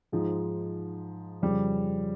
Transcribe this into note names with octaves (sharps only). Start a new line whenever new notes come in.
G#2 F3 G#3 D#4
F2 C#3 G3